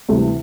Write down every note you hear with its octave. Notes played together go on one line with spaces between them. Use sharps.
D2 C3 E3 G3